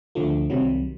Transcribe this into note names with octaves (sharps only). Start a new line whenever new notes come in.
D2 D3 F3 A3
C2 C3 D#3 F#3